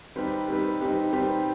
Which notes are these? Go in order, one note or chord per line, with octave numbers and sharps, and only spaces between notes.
G3 C4 D#4 G4 B4
G3 C4 D#4 G4 B4
G3 C4 D#4 G4 B4
G3 C4 D#4 G4 B4